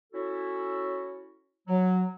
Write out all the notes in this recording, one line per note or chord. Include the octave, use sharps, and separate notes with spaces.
C#4 E4 F#4 A4
F#3